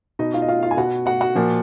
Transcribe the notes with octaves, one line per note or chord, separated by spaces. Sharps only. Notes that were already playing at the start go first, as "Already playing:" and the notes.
B2 D#4 D#5
F4 F5
D#5
F4 F5
F4 F5
G#5
B2 F#4 F#5
F#4 F#5
F#4 F#5
A#2 F3